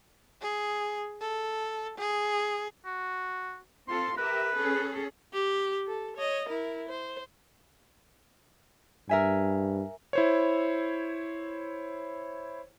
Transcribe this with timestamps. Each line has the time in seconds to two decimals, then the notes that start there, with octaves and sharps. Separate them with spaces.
0.41 G#4
1.21 A4
1.98 G#4
2.85 F#4
3.88 C4 F4 A4 C6
4.17 G4 A#4 B4 E5
4.56 C#4 G#4 A4
5.33 G4
5.87 A4
6.16 C#5 D#5
6.49 E4 A#4
6.88 C5
9.09 G2 A#4 E5 G#5
10.13 E4 C5 C#5